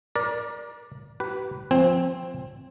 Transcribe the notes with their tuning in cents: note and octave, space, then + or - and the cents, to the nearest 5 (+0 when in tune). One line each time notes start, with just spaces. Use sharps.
A#4 +30 D5 +0
G4 -40 B4 +0
F3 +0 C4 +0 G#5 -30